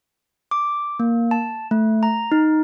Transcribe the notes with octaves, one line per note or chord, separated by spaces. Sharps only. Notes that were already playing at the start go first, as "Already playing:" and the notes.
D6
A#3
A5
A3
A#5
D#4